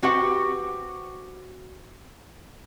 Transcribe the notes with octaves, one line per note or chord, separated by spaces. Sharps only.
C4 F#4 G4 B4 F#5